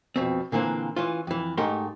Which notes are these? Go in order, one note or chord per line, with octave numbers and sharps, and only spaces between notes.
F2 B2 C4
A#2 D3 E3 A#3 C4
E3 C#4 F4
F2 E3
G#2 A3 D#4 G4 A#4 C6